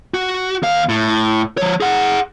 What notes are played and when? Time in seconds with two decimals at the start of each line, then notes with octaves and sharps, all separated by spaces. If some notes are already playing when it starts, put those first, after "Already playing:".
0.14 F#4
0.63 D#2 F5
0.89 A2
1.57 F3 C#5
1.81 G#4 F#5